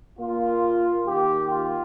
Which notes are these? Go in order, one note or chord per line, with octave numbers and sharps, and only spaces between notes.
A#2 A#3 F4
D#3 A#3 G4
F4